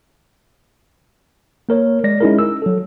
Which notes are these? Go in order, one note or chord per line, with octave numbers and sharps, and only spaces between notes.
A#3 A#4 C#5
G#3 D5 A#6
G#3 C#4 D#4 E4 G#4 A#4
E6
F#3 A4